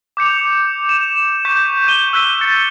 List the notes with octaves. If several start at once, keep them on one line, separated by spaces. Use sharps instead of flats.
D6 G6 C#7 F7
D#7 E7
C#6 G6 B6
G6 D#7 G7
E6 F#6 G6 B6 D#7
A6 C#7